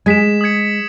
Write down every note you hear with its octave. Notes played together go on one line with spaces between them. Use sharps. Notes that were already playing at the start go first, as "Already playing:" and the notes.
G#3 G#6 B6 E7
D#6 G#6 C#7